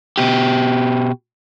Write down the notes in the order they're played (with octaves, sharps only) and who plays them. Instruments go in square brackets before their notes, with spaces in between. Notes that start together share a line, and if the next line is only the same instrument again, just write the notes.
[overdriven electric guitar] B2 G4